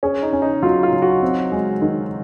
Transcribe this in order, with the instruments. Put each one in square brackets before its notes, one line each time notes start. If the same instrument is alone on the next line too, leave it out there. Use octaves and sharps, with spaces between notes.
[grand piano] C#4 [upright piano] G#4
[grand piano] D#4
[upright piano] C#4
[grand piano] D#4
[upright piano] F#3 [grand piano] F4
[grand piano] F4
[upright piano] F#3
[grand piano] F#4
[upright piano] C4
G#3
D#3